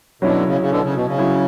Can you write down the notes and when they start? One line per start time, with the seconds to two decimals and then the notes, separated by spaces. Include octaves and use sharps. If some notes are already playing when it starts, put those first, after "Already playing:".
0.22 B2 D3 F#3 C#4 E4
0.47 C#3
0.61 C#3
0.70 B2 D3
0.83 C#3
0.95 B2
1.07 C#3
1.18 F#3 C#4 E4